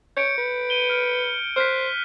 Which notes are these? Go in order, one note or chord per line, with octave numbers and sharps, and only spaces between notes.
C#5 G6 C#7 D7
B4
D#7 G7
F6 D7
C5 F6 F#6 B6